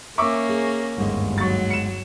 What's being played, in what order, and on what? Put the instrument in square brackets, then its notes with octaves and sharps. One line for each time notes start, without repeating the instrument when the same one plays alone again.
[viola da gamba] A#3 C#4 [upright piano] E5 C#6 D6
[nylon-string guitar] G#4
[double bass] G1 D#2 [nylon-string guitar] G#2 G#3 D#5
[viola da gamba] F#3 [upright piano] C#6 A6
[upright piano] C#7 E7